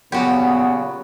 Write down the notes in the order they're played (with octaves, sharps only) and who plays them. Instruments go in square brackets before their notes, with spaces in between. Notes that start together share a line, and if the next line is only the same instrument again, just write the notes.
[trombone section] A#2 C#3 [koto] F#3 F#4 G4 [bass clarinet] B3